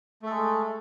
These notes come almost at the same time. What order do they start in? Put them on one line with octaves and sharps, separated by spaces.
A3 A4 G#3